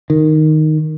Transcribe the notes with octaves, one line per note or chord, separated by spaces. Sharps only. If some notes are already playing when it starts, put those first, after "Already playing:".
D#3